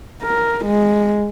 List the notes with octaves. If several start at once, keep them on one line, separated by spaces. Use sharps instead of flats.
A#4
G#3